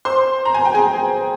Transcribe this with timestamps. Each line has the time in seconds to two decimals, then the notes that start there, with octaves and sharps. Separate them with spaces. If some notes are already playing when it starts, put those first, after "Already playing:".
0.05 C5 C6
0.45 A#5
0.54 G#5
0.65 G5
0.74 G#4 G#5